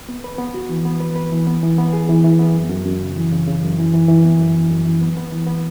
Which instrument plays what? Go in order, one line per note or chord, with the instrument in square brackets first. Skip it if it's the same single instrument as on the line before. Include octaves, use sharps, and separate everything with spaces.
[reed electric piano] B3
B4
B3
F#4
E3
B3
B4
B4
E3
B3
E3
B3
G#4
E3
E3
B3
F#2
F#2
F#2
C#3
E3
C#3
C#3
F#2
E3
E3
E3
B3
F#2
E3
F#2
E3
B3
B3
E3
B3